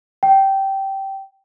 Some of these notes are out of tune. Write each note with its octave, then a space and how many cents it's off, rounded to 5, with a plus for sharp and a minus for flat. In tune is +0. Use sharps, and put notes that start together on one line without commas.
G5 -15